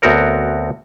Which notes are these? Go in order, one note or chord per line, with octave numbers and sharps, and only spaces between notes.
D2 B3 C4 F#4 A#4 C#5